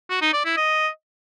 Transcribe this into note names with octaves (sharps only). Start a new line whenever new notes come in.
F#4
D#4
D5
E4
D#5